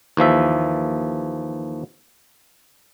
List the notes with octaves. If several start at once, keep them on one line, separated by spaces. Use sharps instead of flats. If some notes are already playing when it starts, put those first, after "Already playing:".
D#2 E3 F3 E5